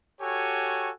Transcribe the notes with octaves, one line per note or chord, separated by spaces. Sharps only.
F#4 G4 A4 C#5 G#5